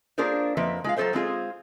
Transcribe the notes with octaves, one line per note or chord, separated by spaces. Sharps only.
A#3 D4 F4 G#4 A#4 C5
F2 F3 A#3 B4 E5
G#3 F4 F5
F#3 F4 G4 A4 C5 E5
G#3 C4 F4 G#4